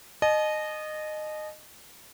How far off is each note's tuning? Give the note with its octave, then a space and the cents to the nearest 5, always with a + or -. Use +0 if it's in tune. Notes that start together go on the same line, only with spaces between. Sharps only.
D#5 -20 A5 -45